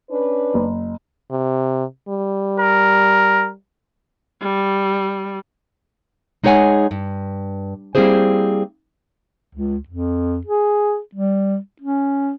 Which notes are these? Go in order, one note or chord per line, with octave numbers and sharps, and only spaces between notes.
C#4 D4 B4
F#1
C3
G3
A#4
G3
G#3 D#4 G#4 C#5 F#5 G#5
G2
G3 A#3 C4 E4 G#4 C5
C#2
F2
G#4
G3
C#4